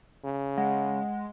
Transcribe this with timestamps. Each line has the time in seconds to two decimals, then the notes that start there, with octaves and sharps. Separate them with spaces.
0.24 C#3
0.57 G#3 F#5